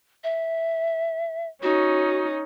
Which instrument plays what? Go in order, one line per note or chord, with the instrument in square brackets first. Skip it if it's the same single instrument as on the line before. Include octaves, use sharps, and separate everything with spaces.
[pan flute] E5
[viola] C#4 D#4 [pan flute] F#4